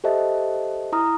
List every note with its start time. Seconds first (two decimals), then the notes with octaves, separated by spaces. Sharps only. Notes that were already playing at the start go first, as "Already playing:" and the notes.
0.04 G4 A4 C5 D#5 E5 A5
0.92 E4 A#5 D#6 F6